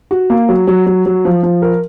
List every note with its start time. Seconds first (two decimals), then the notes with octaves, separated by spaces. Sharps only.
0.11 F#4
0.30 A#3
0.49 F#3
0.67 F#3
0.86 F#3
1.06 F#3
1.25 F3
1.43 F3
1.62 A#4